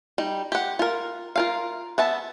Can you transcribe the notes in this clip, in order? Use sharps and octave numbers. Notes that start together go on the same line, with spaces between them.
G3 D#4
G4 F#5
F4 A#4
F4 A#4 F5
B3 E5 A5